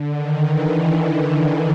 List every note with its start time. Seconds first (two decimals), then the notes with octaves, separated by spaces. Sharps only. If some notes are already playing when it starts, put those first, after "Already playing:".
Already playing: D3
0.15 D#3
0.46 E3